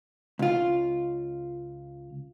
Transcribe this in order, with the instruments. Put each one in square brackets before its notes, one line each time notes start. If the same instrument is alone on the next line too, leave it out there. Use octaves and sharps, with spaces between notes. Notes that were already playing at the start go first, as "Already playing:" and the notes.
[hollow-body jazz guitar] C#2 F4